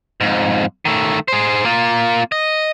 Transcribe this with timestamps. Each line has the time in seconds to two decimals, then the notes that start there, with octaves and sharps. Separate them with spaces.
0.21 F2 G#2
0.85 D#3 A3
1.28 G#4 C5
1.65 A#3 F4
2.32 D#5